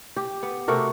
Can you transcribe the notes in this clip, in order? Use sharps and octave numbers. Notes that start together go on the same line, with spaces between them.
G4
B3
C3 A3 F#4 A#4